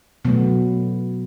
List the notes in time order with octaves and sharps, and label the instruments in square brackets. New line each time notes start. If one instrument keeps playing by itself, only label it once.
[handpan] B2 F#3 A3 B3